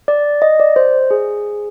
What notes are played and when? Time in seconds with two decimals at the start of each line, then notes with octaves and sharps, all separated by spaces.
0.08 D5
0.42 D#5
0.60 D5
0.76 C5
1.11 G#4